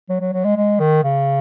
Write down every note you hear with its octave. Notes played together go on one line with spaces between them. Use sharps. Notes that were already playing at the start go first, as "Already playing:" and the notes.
F#3
F#3
F#3
G#3
G#3
D#3
C#3